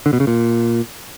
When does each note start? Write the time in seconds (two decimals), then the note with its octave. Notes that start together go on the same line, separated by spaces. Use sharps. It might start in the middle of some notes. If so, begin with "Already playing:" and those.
0.06 D3
0.13 B2
0.20 C#3
0.27 A#2